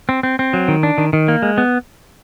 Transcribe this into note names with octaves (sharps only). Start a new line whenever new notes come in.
C4
C4
C4
F#3
D#3
D4
D#3
D#3
A#3
G#3
B3